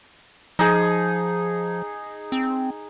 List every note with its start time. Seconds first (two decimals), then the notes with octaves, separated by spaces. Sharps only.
0.59 F3 D#4 G#4
2.32 C4